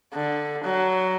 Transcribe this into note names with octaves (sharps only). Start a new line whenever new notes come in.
D3
F#3